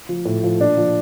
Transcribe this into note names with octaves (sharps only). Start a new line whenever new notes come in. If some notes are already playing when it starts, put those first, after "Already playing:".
F3
A2
F3
A#2 D4
F3